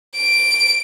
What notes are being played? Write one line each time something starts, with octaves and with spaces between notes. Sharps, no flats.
D7